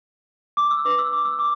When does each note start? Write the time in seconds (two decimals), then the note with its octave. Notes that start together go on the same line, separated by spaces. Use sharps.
0.57 D6
0.71 E6
0.85 D4 B4 D5 D6
0.99 E6
1.12 D6
1.25 E6
1.39 D6